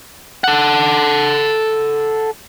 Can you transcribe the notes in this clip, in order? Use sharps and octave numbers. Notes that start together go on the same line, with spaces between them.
A4 F#5